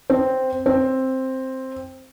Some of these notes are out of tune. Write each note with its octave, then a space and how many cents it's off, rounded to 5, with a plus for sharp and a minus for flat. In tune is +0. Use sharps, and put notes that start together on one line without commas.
C4 -5
C4 +5